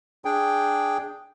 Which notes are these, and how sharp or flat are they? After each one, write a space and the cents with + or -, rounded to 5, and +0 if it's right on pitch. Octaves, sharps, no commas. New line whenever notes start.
D4 +0 G#4 +0 G5 +0